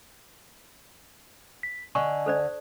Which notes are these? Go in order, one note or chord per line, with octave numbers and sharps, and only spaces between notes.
B6
D3 D#5 G#5 C#6
A4 C5 D5